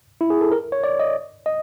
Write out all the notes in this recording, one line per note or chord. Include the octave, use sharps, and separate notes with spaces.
E4
G#4
A4
A#4
C#5
D5
D#5
D#5